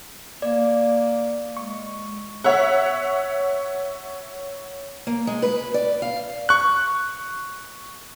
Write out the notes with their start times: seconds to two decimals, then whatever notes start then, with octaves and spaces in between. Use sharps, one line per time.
0.42 A#3 D5
1.57 G#3 C#6
2.44 C#5 E5 F#5
5.07 A#3
5.27 G#3
5.42 B4
5.74 D5
6.02 F5
6.49 C#6 F#6